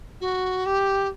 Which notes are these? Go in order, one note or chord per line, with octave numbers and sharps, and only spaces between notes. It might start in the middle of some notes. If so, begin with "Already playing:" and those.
F#4
G4